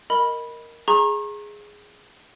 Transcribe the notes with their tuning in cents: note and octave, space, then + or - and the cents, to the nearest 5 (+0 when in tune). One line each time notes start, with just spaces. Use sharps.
A#4 +0 D#5 +0 B5 -10
G#4 +0 A#5 +0 C#6 -40